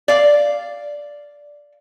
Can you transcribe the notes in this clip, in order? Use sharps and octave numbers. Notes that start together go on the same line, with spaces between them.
D5 F5